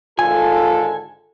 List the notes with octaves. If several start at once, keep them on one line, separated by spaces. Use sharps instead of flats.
G#1 D3 F4 A4 G#5